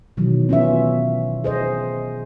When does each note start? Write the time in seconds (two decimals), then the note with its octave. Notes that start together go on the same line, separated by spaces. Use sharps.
0.17 B2 D#3 E3 F#3
0.49 B3 C#4 F4 E5
1.44 G#4 C5 D#5